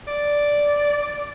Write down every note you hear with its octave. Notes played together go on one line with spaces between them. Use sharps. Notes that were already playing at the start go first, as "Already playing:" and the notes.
D5